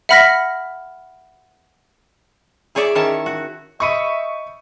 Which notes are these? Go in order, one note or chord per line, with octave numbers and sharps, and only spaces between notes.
E5 F#5 B5 F6 A#6 B6
E4 G#4 C#5 D5 E5
D#3 C#4 E4 C#5 A5
F#4
D#5 E5 B5 C#6 C#7 D#7